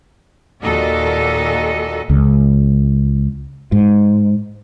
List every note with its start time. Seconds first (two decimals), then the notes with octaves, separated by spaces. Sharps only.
0.61 D#2 A#2 F#4 A4 D#5
2.10 C#2
3.72 G#2